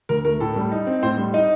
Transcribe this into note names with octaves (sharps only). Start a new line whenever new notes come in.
D2 A#4
A3 A#4
A2 A4
G3
D#4
C4
A2 C5
G3
D#4 D#5